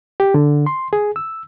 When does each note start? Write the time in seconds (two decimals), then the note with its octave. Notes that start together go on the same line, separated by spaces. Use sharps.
0.20 G4
0.34 D3
0.66 C6
0.93 G#4
1.16 E6